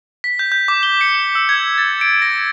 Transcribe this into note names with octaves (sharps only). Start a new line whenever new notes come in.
B6
G6
G6
D6
G7
C#7
G7
E6
G#6
A6
D7
A#6